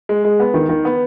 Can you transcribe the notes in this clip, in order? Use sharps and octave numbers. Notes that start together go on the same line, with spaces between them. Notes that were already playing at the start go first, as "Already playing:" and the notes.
G#3
G#3
B3
D#3
D#3
B3